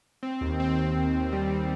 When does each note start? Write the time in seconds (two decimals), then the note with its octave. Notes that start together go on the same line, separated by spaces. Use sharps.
0.23 C4
0.41 D#2
0.60 C4
0.78 C4
0.97 D#2
1.14 D#2
1.33 G3
1.52 C4